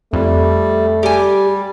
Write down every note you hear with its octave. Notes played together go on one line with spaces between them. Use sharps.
F2 G3 A3
G3 G4 G#5